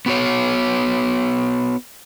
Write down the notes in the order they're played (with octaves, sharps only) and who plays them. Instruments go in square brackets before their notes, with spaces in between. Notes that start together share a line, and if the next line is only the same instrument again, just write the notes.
[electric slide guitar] B3 F#4 C#5